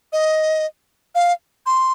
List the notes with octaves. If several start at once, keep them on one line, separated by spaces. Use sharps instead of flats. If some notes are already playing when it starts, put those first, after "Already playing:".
D#5
F5
C6